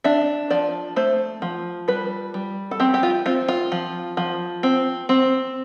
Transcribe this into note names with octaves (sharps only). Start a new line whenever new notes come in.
D4 E5
F3 D5
A3 C5
F3
G3 B4
G3
A4
C4 G4
G4
F4
C4 F4
F4
F3
F3
C4
C4